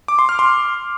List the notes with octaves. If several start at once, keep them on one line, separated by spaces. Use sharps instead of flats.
D6
C6
F6
C6